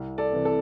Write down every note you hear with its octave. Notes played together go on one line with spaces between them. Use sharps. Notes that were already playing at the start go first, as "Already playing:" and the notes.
Already playing: C2
A4 D5
C3 E3
A4